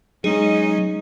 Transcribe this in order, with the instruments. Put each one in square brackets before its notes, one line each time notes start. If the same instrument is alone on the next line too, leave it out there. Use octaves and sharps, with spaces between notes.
[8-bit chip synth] F#3 G#3 [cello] C#4 D#4 [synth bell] G#4